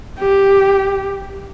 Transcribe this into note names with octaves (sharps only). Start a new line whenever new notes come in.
G4